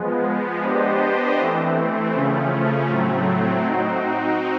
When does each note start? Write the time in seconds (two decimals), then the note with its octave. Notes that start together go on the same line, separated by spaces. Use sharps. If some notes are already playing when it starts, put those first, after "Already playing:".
Already playing: F3 G#3 B3
0.64 B3 D4 G4 C5 D#5
1.38 E3 A3 C4
2.14 C#3 F3 A3 C#4
2.90 A2 F#3 A3 C4
3.66 C4 D#4 F#4